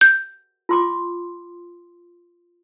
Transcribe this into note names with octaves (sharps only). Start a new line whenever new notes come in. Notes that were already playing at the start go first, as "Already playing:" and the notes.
G6
F4 C6 D6